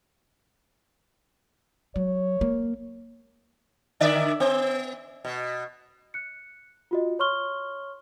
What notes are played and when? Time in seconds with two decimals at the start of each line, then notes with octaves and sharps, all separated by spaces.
1.96 F#3 C#5
2.41 A#3
4.00 D3 D5 E5
4.40 B3
5.25 B2
6.14 F#6 C#7
6.91 F4 F#4 D#5
7.19 C#5 C6 C#6 F6 G7